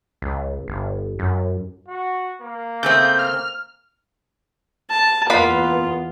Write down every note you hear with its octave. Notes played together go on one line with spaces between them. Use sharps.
C#2
G1
F#2
F#4
A#3
C#3 A3 C4 G6
F6
A5
E2 A#3 B3 F4 B4 B5